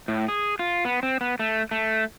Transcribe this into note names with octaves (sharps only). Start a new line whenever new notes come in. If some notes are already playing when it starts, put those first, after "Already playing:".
A2
G#4
F4
B3
C4
B3
A3
A3